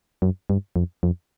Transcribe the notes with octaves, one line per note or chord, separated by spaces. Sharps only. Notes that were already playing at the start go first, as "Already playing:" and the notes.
F#2
G2
F2
F2